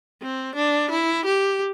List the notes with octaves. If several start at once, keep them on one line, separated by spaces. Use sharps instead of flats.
C4
D4
E4
G4